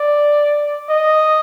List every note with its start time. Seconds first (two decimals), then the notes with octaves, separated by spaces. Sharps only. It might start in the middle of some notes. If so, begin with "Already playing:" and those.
Already playing: D5
0.89 D#5